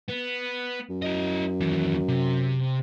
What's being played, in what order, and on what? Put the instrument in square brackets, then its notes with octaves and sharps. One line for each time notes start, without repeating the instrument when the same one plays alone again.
[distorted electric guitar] B3
[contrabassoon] F#2
[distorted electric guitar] E4 D#5
D#2 E3
C3